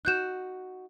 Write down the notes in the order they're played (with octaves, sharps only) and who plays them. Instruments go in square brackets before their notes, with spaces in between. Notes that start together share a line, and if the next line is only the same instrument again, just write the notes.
[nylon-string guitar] D#4 F#4 [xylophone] F#6 G6 E7